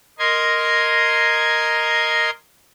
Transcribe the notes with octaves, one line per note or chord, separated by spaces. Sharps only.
A#4 D#5 C6 G#6